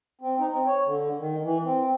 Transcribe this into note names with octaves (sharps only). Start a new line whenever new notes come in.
C4
D#4
C4
C#5
D3
D#3
E3
C4